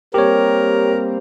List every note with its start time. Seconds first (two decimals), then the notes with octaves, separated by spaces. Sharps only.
0.14 G3 A#3 C4 G4 A#4 C#5